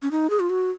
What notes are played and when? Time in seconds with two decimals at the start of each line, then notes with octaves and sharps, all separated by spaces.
0.02 C#4
0.11 D#4
0.30 G#4
0.40 F4
0.50 F#4